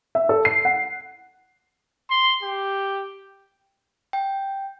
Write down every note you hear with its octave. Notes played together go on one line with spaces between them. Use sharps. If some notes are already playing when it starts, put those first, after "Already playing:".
E5
A4
C7
F#5
C6
G4
G5